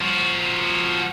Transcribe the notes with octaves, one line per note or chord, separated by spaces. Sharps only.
F3 F#4